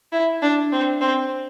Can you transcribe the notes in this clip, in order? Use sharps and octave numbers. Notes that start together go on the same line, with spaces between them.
E4
D4
C4
C4